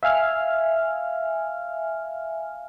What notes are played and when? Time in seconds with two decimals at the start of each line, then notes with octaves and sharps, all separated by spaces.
0.03 E5 F5 G#5 F6